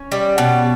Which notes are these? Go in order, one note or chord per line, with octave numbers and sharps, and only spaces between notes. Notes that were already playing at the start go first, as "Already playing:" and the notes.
Already playing: C#4
G3
B2